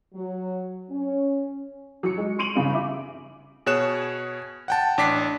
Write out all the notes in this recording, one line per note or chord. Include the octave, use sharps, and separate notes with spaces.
F#3
C#4
F#3 C#7
G#3
C6 C#6 D7 D#7 F7 F#7
G2 C#3
E5 D6
B2 G#4 C#5 F#6 E7
F#5 G5 A5
A1 D4 D6 B6 C7